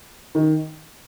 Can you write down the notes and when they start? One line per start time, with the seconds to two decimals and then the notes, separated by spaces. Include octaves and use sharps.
0.35 D#3